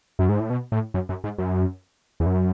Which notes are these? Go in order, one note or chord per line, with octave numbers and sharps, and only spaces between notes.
F#2
G#2
A2
B2
A2
F#2
F#2
G#2
F#2
E2
F#2